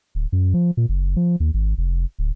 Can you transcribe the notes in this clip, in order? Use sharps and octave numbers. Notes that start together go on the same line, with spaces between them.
D1
F#2
F3
A#2
F#1
F3
D#2
G#1
F1
D1